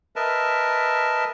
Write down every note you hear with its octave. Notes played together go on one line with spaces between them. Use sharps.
A#4 B4 D#5 E5 A5